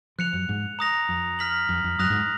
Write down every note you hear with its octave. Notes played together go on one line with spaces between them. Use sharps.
F3 F#6 C#7 F7
F#2
G#2
A#5 D#6 A#6 F7
F2
F6 B6 F#7
F2
F2
F#2 D#6 F#6 A#6 F7
G#2